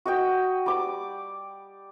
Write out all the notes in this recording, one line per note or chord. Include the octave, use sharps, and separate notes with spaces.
F#4 D#5 G5
G3 D6